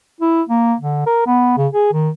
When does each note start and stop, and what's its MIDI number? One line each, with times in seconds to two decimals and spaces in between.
0.20 0.42 64
0.49 0.75 58
0.80 1.02 50
1.06 1.23 70
1.26 1.56 59
1.58 1.68 49
1.73 1.92 68
1.93 2.09 51